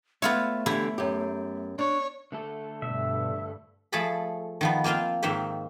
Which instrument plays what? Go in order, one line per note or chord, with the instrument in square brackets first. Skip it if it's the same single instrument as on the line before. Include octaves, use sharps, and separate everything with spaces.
[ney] A3 [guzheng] B3 F4 C#5 [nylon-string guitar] E5
[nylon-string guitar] D3 E3 G4 [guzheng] E4
[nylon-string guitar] F#2 G4
[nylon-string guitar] D4 [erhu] C#5
[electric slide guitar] D3 A3 A4
[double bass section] G2 [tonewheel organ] B2 [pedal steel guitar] E5
[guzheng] F3 A3 G#4 E5 A5 B5
D#3 F3 B3
A#3 C4 F4 C5 F5
G#2 D#3 A#3 C4 C5 E5